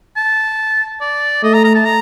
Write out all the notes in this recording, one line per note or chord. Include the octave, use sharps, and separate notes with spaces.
A5
D5
A3 D#5
A#5
A#5
A5
A#5